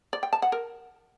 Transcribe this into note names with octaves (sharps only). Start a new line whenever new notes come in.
D5
G5
A5
F#5
A#4